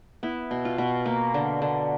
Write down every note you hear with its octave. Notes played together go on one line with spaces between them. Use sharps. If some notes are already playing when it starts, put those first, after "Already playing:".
B3 E4
B2
F4
B2
A#3
D3
D3